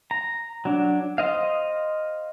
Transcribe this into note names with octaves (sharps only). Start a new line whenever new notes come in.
A#5
F#3 D4
C5 D#5 F5